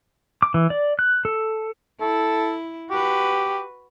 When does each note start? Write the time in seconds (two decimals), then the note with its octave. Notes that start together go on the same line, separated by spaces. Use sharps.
0.42 D6
0.54 E3
0.70 D5
0.99 F#6
1.25 A4
2.01 E4 A4
2.90 F#4 G4 B4